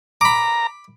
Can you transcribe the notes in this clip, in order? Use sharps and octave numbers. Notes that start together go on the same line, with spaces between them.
A#5 B5 D6